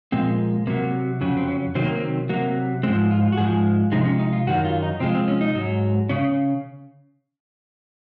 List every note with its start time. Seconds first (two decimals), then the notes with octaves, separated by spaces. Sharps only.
0.12 A#2 F3 G#3 C4
0.67 C3 F#3 A#3
1.21 F2 C#3 F#3
1.37 C4
1.48 C#4
1.75 C3 D#3 F#3 C4
1.84 A#3
1.95 C4
2.29 C3 F#3 A#3
2.83 G#2 F3 G#3 C4
3.11 F4
3.32 F#4
3.37 G#2 F3 G#3 G#4
3.92 C3 F3 G#3 D#4
4.05 C#4
4.19 D#4
4.32 F4
4.47 F#2 D#3 F#3 F#4
4.65 F4
4.83 D#4
5.00 C3 F3 G#3 C4
5.15 C4
5.28 C#4
5.41 D#4
5.55 G#2 F#3
6.09 C#3 C#4